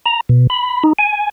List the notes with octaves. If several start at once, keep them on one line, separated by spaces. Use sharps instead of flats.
A#5
B2
B5
D#4
G#5